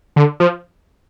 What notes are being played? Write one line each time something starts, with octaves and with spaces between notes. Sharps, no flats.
D3
F3